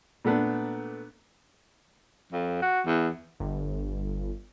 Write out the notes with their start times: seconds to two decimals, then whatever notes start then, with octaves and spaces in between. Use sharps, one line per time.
0.25 A#2 A3 B3 D4
2.32 F2
2.62 F#4
2.86 E2
3.40 G1